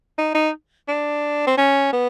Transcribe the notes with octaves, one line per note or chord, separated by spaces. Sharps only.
D#4
D#4
D4
C4
C#4
B3